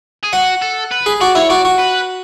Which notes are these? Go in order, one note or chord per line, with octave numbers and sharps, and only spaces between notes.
G#4
F#4 F#5
A4
B4
G#4
F#4 D5
E4 C#5
F#4 D5
F#4
B4